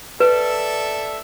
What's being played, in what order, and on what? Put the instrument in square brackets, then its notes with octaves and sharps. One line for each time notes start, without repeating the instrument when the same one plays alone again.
[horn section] A4 D5 E5 [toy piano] B4